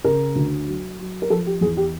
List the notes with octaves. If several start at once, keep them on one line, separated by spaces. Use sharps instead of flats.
C#3 A#4
D2
F#3
F#3
A#4
F3 A4
G4
E2 G#4
G4